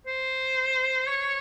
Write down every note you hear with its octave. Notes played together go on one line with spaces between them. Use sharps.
C5
C#5